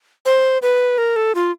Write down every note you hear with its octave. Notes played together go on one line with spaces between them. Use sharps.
C5
B4
A#4
A4
F4